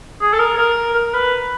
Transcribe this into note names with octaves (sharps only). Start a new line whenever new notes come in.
G#4
A4
A#4
A#4
A#4
B4